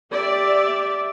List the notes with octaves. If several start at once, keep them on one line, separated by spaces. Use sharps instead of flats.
G4 D5 E5